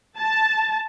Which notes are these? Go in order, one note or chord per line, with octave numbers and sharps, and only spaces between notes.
A5